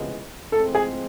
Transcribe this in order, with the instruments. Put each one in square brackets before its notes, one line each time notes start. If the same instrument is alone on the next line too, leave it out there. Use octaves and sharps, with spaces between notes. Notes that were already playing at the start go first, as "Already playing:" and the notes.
Already playing: [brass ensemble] C#2 C3 E3 G#3 B3
[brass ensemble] A2 F3 G#3 C4 [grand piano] A4
[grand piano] G#4